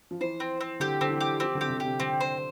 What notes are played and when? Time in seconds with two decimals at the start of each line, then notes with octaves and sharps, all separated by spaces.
0.11 F3
0.21 E3 C5
0.40 C4
0.61 C4
0.80 D3 G4
1.01 D3 C4
1.10 E3
1.21 G4
1.40 F3 C4
1.55 D3
1.61 C3 G4
1.70 D3
1.80 C3 G4
2.00 D3 C4
2.20 C5